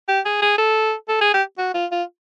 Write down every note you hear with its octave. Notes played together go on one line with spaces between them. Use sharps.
G4
G#4
G#4
A4
A4
G#4
G4
F#4
F4
F4